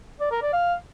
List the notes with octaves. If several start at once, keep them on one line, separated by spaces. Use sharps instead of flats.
D5
A#4
D5
F5